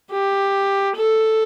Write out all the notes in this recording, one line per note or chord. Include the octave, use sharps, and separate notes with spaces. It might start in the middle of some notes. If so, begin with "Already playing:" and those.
G4
A4